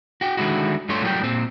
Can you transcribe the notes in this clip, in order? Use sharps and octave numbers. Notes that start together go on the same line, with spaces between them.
F#4 G5
D3 D#3 F3 G#3 E4 F#4
G2 G3 A3 F4 C#5 C6
A2 F#3 G3 A#4 G5
A#2 C4